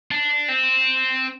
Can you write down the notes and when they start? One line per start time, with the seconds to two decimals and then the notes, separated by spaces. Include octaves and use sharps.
0.11 D4
0.49 C4